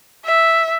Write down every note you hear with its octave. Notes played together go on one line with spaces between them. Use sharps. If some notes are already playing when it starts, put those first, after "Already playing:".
E5